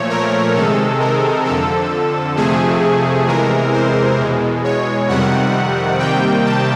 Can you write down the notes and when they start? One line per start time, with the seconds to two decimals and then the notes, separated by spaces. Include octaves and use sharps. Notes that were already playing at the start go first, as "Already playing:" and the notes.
Already playing: A#2 F3 A3 C#5
0.10 A#4
0.55 C3 D#3 G#3 A4
1.00 A#4
1.45 F2 D3 F3 A4
2.36 F2 C3 F3 A3 G#4
3.27 E2 C3 E3 G#3 A#4
3.73 C5
4.18 E2 B2 G#3
4.64 C#5
5.08 F2 C3 D#3 G3 F#5
5.99 C3 D#3 G3 A#3 G5
6.45 A5